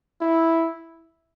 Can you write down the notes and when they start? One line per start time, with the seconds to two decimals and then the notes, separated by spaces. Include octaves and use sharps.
0.21 E4